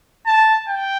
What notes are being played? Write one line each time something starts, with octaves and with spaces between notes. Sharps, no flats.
A5
G5